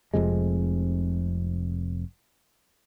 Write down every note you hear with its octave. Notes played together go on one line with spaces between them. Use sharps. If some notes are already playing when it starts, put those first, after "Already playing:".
F1 F2 C3 G#3